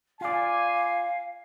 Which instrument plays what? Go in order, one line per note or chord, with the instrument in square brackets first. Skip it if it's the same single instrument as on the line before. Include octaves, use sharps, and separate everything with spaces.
[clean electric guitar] F4 D5 [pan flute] F5 [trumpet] G#5